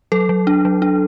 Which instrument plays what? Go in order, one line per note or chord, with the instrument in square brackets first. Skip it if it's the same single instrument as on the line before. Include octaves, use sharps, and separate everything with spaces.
[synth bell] F#3 A4
F#3
D4
F#3
D4